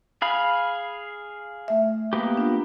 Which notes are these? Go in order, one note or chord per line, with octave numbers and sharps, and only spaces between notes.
G#4 F5 B5
A3 E5
A#3 B3 G4
D4 F4